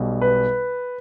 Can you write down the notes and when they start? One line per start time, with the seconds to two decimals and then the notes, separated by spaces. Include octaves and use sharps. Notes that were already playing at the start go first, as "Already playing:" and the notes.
Already playing: B1 B2 G3
0.21 B4